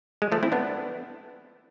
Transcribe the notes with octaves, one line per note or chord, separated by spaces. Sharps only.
G#3
F3 A3
C4 E4
B3 D4